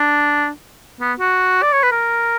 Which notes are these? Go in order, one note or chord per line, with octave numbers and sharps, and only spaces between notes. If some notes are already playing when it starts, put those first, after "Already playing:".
Already playing: D4
B3
F#4
D5
C#5
B4
A#4